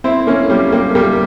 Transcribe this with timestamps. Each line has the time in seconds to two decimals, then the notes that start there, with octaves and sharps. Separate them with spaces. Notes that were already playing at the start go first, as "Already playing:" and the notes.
0.04 C4 E4
0.27 A#3 C#4
0.50 G3 A#3
0.72 G3 A#3
0.95 G3 A#3